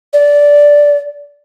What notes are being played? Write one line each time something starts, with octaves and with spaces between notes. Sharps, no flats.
D5